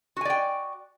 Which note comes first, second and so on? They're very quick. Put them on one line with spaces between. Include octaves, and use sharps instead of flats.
F#4 G#5 D5 G5